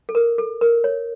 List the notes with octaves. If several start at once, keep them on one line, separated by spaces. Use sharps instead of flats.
A4
A#4
A4
A#4
C#5